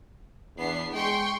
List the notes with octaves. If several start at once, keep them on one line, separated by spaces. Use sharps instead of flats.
E2 B3 D4 C7
G#3 G5 C6 C#6